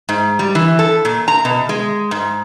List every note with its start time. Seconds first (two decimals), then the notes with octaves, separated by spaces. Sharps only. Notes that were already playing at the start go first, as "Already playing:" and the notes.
0.09 G#2
0.39 G3
0.55 E3
0.79 A4
1.05 A#2
1.28 A#5
1.45 B2
1.69 G#3
2.11 G#2